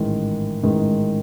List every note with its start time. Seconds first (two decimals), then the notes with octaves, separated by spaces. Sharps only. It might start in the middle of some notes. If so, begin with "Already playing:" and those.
Already playing: A1 G#2 D#3 G#3
0.63 A1 G#2 D#3 G#3